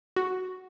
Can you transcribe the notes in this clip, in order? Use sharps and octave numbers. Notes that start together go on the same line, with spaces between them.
F#4